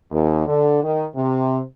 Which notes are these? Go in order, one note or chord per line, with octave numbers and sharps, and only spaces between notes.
D#2
D3
D#3
C3